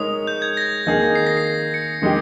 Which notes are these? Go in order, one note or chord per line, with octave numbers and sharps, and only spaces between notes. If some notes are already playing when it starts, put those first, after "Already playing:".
Already playing: G#3 D#4 A#4 C#5 D#6
G6
G#6
A#6
D#3 A#3 D#4 G#4
C7
A#6
C7
C#7
D#3 G#3 D#4 G4